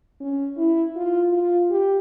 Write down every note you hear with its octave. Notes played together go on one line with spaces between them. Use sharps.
C#4
E4
F4
F4
G4